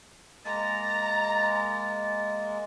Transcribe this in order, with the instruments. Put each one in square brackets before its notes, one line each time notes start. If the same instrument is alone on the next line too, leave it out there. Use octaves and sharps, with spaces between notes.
[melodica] G#3 A#3 [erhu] A#5 [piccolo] A6